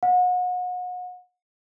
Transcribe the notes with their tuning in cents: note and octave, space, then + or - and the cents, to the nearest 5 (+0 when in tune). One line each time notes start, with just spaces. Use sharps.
F#5 -35